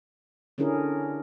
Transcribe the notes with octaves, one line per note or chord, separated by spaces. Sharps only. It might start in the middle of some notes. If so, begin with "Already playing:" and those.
D3 C#4 D4 E4 G#4 A#4